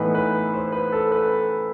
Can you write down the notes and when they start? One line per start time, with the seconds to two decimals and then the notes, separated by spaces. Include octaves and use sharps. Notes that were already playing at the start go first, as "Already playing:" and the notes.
Already playing: A2 E3 B3 D#4 B4
0.15 B4
0.54 C5
0.72 B4
0.92 A4
1.12 B4